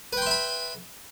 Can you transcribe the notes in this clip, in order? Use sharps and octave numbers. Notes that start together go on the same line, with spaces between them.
B4 E5 G5 B5 C6